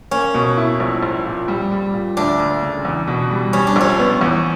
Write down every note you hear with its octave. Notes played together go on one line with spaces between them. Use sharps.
A#3 C#4
B2
E4
A#1
A#1
A#2
G3
G3
A#2
D2 D4
D2
C#3
E2
B2
G3
G3 C#4
D4
A#1 C#4
B3
E2